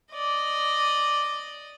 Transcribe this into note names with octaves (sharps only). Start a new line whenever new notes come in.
D5 D#5